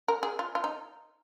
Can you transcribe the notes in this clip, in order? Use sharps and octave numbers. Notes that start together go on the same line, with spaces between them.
A#4
G#4
F4
F4
D#4